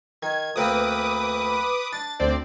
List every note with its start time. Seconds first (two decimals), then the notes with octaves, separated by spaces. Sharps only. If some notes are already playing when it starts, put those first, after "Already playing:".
0.23 D#3 G#6
0.56 D2 A#3 C4 B4 D6 D#6
1.93 D4 A6
2.20 D2 C4 D5